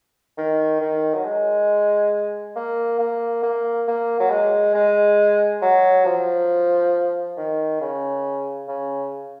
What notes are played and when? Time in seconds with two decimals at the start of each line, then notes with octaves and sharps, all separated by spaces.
0.38 D#3
0.81 D#3
1.15 F#3
1.25 G#3
2.56 A#3
2.99 A#3
3.43 A#3
3.88 A#3
4.20 F#3
4.31 G#3
4.75 G#3
5.62 F#3
6.06 F3
7.37 D#3
7.81 C#3
8.68 C#3